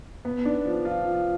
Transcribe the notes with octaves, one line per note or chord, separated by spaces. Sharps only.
B3
D4
F3
F4
F3